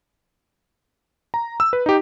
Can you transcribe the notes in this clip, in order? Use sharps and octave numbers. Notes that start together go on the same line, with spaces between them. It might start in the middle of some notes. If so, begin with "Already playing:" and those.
A#5
E6
B4
D#4 G4